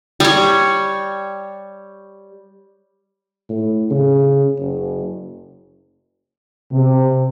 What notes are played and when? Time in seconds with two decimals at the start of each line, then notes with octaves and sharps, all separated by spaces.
0.20 G3 C#5
3.49 A2
3.91 C#3
4.60 F#1
6.73 C3